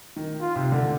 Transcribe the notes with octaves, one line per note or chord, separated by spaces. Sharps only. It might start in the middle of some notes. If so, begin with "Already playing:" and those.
D#3
F4
C3
D3